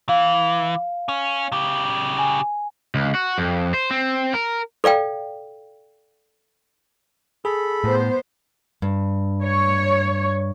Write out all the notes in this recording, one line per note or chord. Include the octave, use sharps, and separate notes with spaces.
E3 F5
C#4
C#3 G4
G#5
C#2
F#4
F2
C5
C4
A#4
A4 D5 F5 G5
G#4 A4 B5
A2 B3 C5
G2
C#5